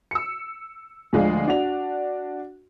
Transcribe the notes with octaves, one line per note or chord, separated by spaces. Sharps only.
E6 C#7
D2 F3 G#3 D4 F5
D4 F#4 F7